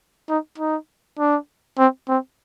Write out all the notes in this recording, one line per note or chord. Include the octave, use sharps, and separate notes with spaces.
D#4
D#4
D4
C4
C4